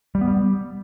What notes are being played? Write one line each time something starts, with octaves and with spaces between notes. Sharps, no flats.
G3
B3
G3